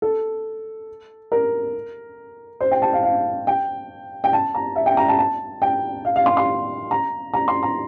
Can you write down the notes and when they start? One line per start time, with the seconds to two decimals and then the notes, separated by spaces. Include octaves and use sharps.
0.02 A4
1.32 A#4
2.61 C5
2.71 G5
2.82 A5
2.93 F5
3.03 F5
3.47 G5
4.24 G5
4.33 A5
4.55 A#5
4.76 E5
4.86 G5
4.97 A#5
5.08 A5
5.19 A5
5.62 G5
6.05 F5
6.16 F5
6.26 C6
6.37 C6
6.91 A#5
7.33 A#5
7.48 C6
7.63 A#5